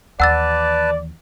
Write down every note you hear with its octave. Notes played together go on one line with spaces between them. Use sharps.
D#2 E3 B4 D5 F#5 A5 E6 A6